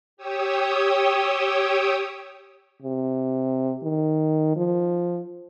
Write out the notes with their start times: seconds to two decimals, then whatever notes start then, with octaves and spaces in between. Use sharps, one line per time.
0.17 G4 C#5 G5 D#6 E6
2.82 C3
3.84 D#3
4.56 F3